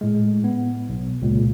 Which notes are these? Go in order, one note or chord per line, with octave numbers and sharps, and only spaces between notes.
A2 G#3
B3
B1
C#2 A#2